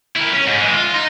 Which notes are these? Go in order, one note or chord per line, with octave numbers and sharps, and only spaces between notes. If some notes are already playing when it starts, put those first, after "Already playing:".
E4 A#4
C#4
G#2
E3 G#3
F4
D#4